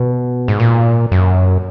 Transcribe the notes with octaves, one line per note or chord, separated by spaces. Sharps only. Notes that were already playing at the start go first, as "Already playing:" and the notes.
Already playing: B2
G#2
A#2
F#2